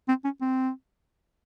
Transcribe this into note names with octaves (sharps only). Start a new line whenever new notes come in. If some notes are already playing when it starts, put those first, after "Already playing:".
C4
C#4
C4